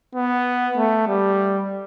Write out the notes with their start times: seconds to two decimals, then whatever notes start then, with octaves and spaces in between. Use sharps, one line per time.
0.15 B3
0.77 A3
1.08 G3